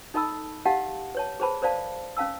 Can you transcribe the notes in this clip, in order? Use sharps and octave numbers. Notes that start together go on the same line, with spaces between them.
D#4 A4 D#5 A5 B5 E6
G4 D#5 F5 F#5 A5
B4 C#5 A5
G#4 B4 C5 A5 B5
A#4 C5 D5 F5 A5
C#4 F5 A5 E6